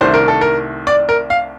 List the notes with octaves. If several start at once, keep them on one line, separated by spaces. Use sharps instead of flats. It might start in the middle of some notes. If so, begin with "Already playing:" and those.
C2 C3 D#3 A3 D4 C5
A#4
A4
A#4
D5
A#4
F5